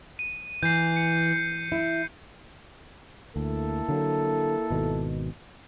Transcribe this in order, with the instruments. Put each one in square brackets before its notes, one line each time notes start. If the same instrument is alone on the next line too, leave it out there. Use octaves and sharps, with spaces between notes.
[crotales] D#7
[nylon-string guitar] E3 [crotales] G6 C7
[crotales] C#7
[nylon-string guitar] E4
[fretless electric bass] D2 [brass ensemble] A#3 E4 A4
[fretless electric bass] D3 F#3
G#1 B2 D#3